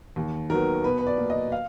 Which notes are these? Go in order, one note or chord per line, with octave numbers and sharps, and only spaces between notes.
D#2
D#3 F#3 B3 A#4
B2 B4
B4
D5
A#3
D#5
F5